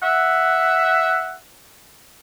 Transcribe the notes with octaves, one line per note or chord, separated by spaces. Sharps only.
E5 F#5